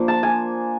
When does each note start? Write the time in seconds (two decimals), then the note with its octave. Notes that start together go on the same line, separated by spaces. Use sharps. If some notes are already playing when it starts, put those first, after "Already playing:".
Already playing: F3 A#3 D4
0.08 A5
0.23 G#5